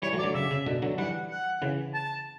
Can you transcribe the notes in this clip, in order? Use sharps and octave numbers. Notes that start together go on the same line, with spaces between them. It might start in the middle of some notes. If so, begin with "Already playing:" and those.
E3 G3 C#5
F#3 A3
D5
D3 F#3
C#3 E5
C#3
B2 D3
D3 F#3
E3 G3 F#5
F#5
C#3 E3
A5